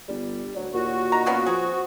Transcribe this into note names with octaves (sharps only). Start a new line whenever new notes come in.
G1 G3
D2 F#3
D#2 A#2 F#4
D#4 A#5
A#3 B3 C#4
F3 C4 G#4